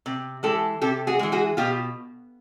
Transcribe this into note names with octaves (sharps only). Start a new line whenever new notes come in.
C3
E3 G#3 G4 A4
C3 G4 A4
F#4 G#4
E3 G#3
F#4 G#4
B2 F4 G4